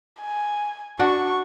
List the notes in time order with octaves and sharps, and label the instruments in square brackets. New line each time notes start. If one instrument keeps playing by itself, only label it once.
[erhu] G#5
[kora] D4 F#4 [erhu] C#6